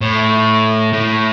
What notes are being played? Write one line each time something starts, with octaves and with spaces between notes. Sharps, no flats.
A2
A2